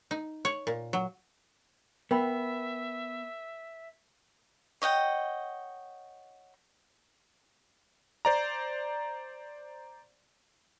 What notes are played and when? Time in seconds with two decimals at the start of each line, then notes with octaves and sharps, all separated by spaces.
0.11 D#4
0.45 C#5
0.67 A#2
0.93 F#3
2.11 B3 A#4 E5 G5 B5
4.82 C#5 D#5 F#5 G5
8.25 C5 D5 A#5